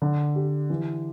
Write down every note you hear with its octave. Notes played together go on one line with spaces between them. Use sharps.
D3
G4
E3